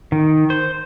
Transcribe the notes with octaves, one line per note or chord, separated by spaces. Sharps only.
D#3
C5